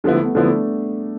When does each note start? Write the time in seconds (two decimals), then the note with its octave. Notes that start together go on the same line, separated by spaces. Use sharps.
0.04 D3 F3 G3 B3 E4
0.14 A3
0.25 B3
0.35 D3 F3 B3 D4 E4
0.46 A3